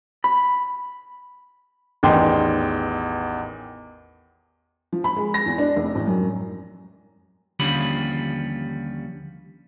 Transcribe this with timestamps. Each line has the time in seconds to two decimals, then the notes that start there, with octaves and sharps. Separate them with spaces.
0.24 B5
2.03 A1 E2 D#3 G5 C6
4.93 F3
5.04 B5
5.16 G#3
5.34 A#6
5.46 E2
5.58 D4
5.76 F1
5.95 A1
6.07 F#2
7.59 D#2 D3 F3 G3 C#4 B5